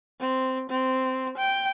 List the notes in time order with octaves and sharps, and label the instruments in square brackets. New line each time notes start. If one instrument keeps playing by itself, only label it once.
[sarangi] C4
C4
G5